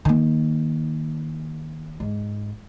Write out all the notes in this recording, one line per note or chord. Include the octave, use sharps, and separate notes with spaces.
D#3 A#3
G#2